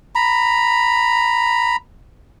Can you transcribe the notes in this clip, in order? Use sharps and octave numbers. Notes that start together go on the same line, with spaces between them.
A#5 B5